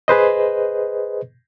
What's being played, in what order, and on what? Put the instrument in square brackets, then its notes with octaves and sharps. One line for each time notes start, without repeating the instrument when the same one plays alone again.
[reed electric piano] G#4 B4 C5 D#5